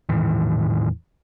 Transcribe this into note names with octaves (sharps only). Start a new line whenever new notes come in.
E2 A2 D#3 E3